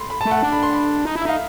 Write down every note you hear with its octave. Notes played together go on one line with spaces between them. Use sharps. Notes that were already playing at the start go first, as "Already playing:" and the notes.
Already playing: B5 C6
B5
A3 A5
F#5
D4
B5
C6
B5
D#4
E4
E5
D#4 F5